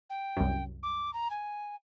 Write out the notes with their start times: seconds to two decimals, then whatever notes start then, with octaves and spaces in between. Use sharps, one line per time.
0.10 G5
0.37 C2 F#2
0.83 D6
1.13 A#5
1.30 G#5